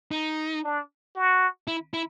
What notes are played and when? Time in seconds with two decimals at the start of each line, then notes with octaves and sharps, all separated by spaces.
0.11 D#4
0.64 D4
1.15 F#4
1.68 E4
1.94 E4